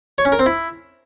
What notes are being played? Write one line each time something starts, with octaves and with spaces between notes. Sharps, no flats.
C#5
C#4
A#4
C4
E4